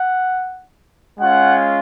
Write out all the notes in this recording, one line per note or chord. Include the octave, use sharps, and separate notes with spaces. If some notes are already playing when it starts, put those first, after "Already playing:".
Already playing: F#5
G#3 C#4 F4 F#5